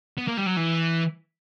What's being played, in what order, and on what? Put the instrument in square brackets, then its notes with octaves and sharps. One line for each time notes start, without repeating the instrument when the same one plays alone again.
[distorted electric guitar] B3
A#3
G3
F#3
E3